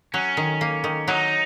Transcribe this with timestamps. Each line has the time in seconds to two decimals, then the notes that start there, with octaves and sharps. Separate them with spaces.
0.14 F#3 C#4
0.37 D#3
0.61 A#3
0.84 D#3
1.08 F#3 D#4